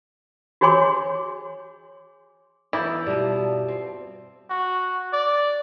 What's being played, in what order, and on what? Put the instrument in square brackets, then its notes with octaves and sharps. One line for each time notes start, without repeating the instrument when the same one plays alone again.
[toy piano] F#4 G#4 C#5 G#5 C6 D6
[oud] E3 B3 A#4 [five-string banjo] E4 [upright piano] D6 G6 A6
[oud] B2 F4 [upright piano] G3 [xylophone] D5 A5
[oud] C4
[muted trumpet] F#4
D5